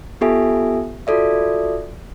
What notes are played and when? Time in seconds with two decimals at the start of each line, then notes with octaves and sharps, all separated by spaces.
0.21 B3 F4 G4 A4 E5 G#5
1.07 F4 F#4 A4 D5 E5